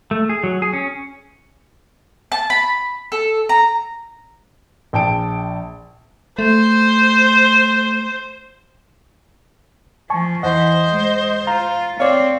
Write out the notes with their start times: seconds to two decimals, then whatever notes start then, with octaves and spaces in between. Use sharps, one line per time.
0.11 A3
0.29 G#4
0.44 F#3
0.62 G#4
0.73 C#4
2.32 A5
2.50 B5
3.12 A4
3.49 A#5
4.93 A#1 G5 A5 D7
6.39 A3 C5
10.10 F3 G#5 A5 C#6
10.43 E2 E3 C5 D#5 F#5
10.91 G#3
11.47 F4 F5 A#5
12.00 C4 C#5 D5 F5